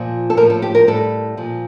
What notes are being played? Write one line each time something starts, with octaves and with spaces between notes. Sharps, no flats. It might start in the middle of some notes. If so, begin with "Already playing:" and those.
Already playing: A#2 F3
A4
A2 F3 A#4
A4
G4
A#4
A2 G3 A4
A#2 F3